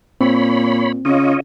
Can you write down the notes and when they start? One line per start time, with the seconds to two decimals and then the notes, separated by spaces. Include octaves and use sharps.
0.21 A#2 C4 C#5 B5
1.05 C#3 F4 C#5 D#5